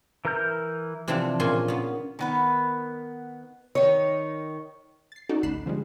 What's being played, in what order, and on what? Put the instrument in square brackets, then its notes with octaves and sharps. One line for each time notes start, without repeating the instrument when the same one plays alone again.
[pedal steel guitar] E3 A#4 A#5 F6 G6
[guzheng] C3 E3 F3 C4 D4
A#2 C#3 F4 G#5 C6
C#3 B3
[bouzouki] D#3 B3 B4
[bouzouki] D#3 D#4 [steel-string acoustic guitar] C#5
[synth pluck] A6 C7
C#4 D#4 F#4 A4 D5
A1 D2 B5 F#6 C7 E7
D3 F3 G3 G#3